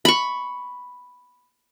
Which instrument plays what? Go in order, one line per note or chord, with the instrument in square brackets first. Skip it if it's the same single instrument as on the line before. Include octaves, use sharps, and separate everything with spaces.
[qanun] B5 C#6